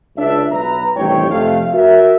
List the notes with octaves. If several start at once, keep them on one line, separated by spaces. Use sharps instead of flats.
C#2 D4 E5
B1 B4 A#5
A1 G2 C3 D#3 C#5 G5
F2 C3 A3 F5
F#4 A#4 E5